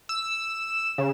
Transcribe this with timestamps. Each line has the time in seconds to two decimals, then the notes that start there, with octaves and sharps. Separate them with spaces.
0.09 E6
0.98 C#3